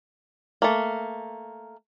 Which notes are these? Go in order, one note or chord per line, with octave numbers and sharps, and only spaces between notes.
A3 A#3